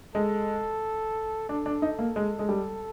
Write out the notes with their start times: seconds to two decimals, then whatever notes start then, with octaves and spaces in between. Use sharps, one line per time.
0.15 G#3 A4
1.49 D4 A4
1.66 D4
1.82 D#4
1.99 A#3
2.16 G#3
2.39 G#3
2.49 G3